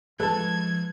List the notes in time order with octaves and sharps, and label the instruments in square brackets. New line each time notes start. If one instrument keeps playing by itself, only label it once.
[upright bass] F3 [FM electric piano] G#3 B4 F#6 [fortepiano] A4 A5 [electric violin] G#6